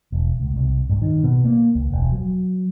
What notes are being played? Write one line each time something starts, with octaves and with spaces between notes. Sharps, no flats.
E1
C#2
C2
G2
D#3
B2
A#3
C#2
E1
F#3